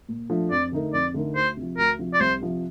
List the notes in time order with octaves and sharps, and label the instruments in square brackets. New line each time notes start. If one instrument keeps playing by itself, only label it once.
[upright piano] A#2
F3 A3 D4
[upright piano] F2 [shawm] D5
[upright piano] D3 A3 D#4 A#4
[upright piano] F2 [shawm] D5
[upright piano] D3 A3 D#4 A#4
[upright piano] D2 [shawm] C5
[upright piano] C3 F3
[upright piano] D2 [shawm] A#4
[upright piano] C3 F3
[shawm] D5
[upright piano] C2 [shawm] C5
[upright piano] C3 F3